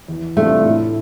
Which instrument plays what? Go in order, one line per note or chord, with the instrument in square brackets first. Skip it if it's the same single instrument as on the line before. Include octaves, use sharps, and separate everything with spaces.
[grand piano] E2
[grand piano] C3 G3 D4 F4 [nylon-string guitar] A3
[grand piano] A2